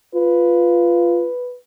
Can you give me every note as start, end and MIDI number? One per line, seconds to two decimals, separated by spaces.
0.15 1.29 65
0.15 1.56 71